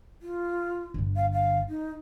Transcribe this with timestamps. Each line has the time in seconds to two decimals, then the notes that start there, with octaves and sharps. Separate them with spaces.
0.22 F4
0.94 G1 D3
1.16 F5
1.33 F5
1.69 D#4